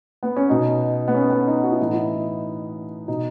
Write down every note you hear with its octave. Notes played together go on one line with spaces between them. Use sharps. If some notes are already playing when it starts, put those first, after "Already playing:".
B3
C#4
B2 D#4
B3
C#4
B3
D#4
F#4
E4
A2 E3 D#4
E4
B2 D#4